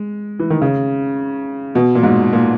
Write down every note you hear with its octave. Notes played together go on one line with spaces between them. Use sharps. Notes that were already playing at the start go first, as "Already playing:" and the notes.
Already playing: G#3
E3
D#3
C#3
B2
A#2
G#2
A#2